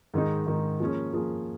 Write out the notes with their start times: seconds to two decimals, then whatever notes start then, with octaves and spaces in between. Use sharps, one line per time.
0.14 G#2 D#3 G#3 D#4
0.46 G#2 D#3 G#3 D#4
0.80 F3 A#3 C#4 G#4
1.13 F3 A#3 C#4 G#4